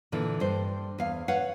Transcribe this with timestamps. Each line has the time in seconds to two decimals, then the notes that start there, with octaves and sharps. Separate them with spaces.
0.12 A#2 D3 E3
0.40 G2 C5
0.98 E2 F5
1.28 B4 C#5 F5 F#5